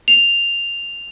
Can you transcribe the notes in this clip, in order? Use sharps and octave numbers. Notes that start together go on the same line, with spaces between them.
F7